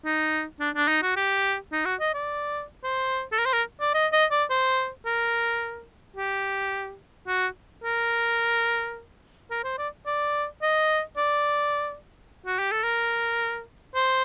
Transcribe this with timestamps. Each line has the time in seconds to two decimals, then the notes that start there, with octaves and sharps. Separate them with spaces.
0.05 D#4
0.60 D4
0.75 D4
0.88 D#4
1.02 F#4
1.16 G4
1.72 D#4
1.85 F#4
2.00 D#5
2.14 D5
2.84 C5
3.32 A4
3.38 A#4
3.46 C5
3.53 A#4
3.81 D5
3.94 D#5
4.12 D#5
4.31 D5
4.50 C5
5.06 A#4
6.17 G4
7.27 F#4
7.84 A#4
9.51 A#4
9.64 C5
9.78 D5
10.06 D5
10.62 D#5
11.17 D5
12.46 F#4
12.59 G4
12.72 A4
12.83 A#4
13.95 C5